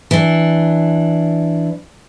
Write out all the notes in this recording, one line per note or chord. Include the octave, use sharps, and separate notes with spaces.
E3 D4